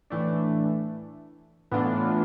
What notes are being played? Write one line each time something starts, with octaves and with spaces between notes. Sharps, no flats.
A2 E3 A3 D4
A2 E3 B3 D4 F4